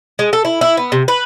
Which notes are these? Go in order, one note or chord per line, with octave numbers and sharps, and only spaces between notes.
G#3
A4
E4
E4
B3
C3
B4